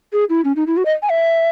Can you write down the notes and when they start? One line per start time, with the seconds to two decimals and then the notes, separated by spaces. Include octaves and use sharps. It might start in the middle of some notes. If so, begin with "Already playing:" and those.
0.13 G#4
0.30 E4
0.45 C#4
0.56 D#4
0.67 E4
0.77 F#4
0.86 D#5
1.02 G#5
1.10 E5